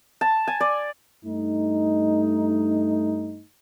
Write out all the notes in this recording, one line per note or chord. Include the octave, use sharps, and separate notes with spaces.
A5
G#5
D5
G2 A3 D#4